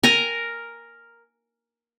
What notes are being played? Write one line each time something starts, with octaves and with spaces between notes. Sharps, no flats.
A#4 G#5 A#5